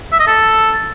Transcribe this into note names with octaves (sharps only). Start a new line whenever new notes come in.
E5
D#5
A4